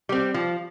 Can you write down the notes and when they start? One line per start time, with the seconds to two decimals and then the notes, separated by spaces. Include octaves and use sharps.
0.09 G3 C4
0.34 F3